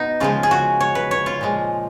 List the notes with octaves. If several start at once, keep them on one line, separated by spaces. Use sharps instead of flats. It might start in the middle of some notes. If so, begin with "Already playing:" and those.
Already playing: B2 B3 D#4
C#3 F3 G#3 F4
G#4
F#4
C#5
B4
C#5
F4
A#2 F3 G#3